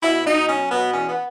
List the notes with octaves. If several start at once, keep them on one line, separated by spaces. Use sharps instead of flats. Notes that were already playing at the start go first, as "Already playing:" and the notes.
B2 E4
B2 D#4
F#3 C#4
B2 B3
E2 C#4
B3